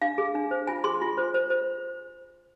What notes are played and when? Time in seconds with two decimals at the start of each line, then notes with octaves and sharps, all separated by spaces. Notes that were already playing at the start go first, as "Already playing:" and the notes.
0.02 D4 F5
0.18 G#4
0.35 D4
0.51 C5
0.67 F4 G#5
0.84 G#4 C6
1.02 F4
1.17 C5
1.34 C5
1.50 C5